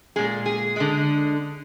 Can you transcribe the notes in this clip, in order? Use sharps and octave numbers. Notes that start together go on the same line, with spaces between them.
A#2 G#3 G#4
G#4
D3 G#3